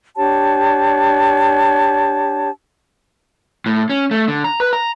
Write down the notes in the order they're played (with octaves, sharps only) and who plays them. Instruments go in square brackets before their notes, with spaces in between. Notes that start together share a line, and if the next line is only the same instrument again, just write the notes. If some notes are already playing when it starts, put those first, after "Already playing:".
[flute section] D4 G4 C#5 A5
[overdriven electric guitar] A2
C#4
A3
D3
A#5
B4
A#5